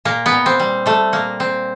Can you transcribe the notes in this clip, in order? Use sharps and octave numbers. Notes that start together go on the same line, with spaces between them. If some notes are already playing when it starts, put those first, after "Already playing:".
A#2 A#3
B3
A#2
C4
G3
G3 A3
A#2 A#3
A#2 C4